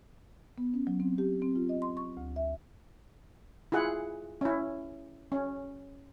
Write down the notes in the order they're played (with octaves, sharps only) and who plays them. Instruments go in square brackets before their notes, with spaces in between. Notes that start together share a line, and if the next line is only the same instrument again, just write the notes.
[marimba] B3
C#4
F#3
C4
G4
C4
F4
D#5
C6
C#6
D2
E5
[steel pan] E4 F4 G#4 F#5
C#4 E4
C#4